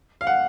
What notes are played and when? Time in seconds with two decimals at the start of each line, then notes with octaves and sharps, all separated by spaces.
0.21 F5
0.27 F#5